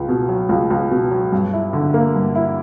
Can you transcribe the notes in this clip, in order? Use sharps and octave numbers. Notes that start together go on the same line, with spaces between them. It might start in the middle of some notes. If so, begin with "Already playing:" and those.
Already playing: C#2
B2
F#3
C#2
C#2
B2
F#3
G2
E4
D3
A#3
G2
E4